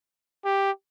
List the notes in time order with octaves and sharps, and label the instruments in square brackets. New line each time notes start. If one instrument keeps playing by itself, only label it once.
[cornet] G4